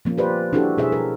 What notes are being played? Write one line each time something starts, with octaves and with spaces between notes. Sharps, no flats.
F3 A#3 C#4
G4 B4 C5 D5
D4 E4 F#4 G4 A4
B2 C#4 G#4 C5 E5
F3 A#4